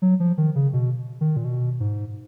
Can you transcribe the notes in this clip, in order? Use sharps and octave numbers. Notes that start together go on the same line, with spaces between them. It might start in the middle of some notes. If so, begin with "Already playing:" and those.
F#3
F3
D#3
C#3
B2
D#3
A#2
B2
G#2